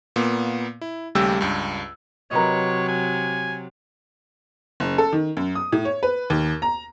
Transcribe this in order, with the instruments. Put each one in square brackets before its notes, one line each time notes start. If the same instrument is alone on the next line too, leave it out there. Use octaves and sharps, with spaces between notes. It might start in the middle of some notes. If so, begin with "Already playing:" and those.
[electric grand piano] A#2 A#3 B3
E4
D#2 C#3 G3 A3 G4 E6
C#2 G2
[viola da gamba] C3 F#3 [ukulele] A#4 B4 D#5 [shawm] C#5
[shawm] G#5
[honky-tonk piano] F#1
A4
D#3
F#2
D#6
A2
C#5
B4
D#2
A#5